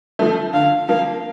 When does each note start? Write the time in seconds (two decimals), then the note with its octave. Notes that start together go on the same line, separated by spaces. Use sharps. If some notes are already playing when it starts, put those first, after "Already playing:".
0.19 F3 A3
0.53 D3 F5
0.88 F3 A#3 F5